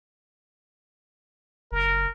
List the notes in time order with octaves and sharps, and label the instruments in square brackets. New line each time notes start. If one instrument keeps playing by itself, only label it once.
[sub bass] F#1 [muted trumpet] A#4